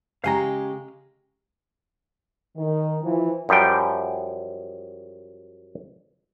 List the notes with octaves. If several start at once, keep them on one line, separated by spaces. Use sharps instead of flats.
C#3 G#3 G4 F5 G#5 A#5
D#3
E3 F3
F#2 F3 G3 F#5 G5